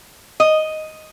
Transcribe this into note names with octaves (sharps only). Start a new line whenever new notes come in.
D#5